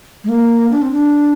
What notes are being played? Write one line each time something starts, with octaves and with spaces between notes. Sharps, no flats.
G#3
A#3
D4
C4
D4